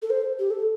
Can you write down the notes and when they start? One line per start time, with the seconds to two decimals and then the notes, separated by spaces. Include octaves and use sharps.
0.02 A4
0.10 C5
0.39 G4
0.50 A4